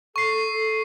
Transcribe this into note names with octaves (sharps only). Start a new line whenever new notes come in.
A4 C#6 C7